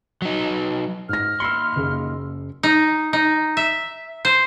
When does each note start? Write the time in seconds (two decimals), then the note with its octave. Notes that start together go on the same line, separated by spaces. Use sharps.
0.22 F#3 D#4
1.09 G#2 F6 A#6
1.40 D#2 B5 C6 E6 C7 C#7
1.76 F#1 G#4
2.63 D#4
3.13 D#4
3.57 E5
4.25 C5